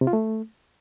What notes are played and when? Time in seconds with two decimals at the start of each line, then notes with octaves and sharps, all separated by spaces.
0.01 C3
0.07 F4
0.13 A3